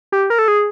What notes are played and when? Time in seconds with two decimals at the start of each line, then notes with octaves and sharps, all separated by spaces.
0.12 G4
0.30 A#4
0.39 A4
0.48 G#4